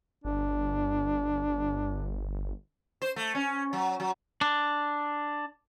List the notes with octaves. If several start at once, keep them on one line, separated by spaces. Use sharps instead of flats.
G1 D4
C5
A3
C#4
F#3
F#3
D4